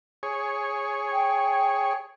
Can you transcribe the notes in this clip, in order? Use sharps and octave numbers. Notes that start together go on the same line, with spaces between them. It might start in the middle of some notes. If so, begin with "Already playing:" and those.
G#4 C#5
G5